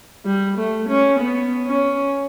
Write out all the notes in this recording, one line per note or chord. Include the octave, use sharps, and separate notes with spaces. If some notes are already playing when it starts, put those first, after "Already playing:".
G3
A3
C#4
B3
C#4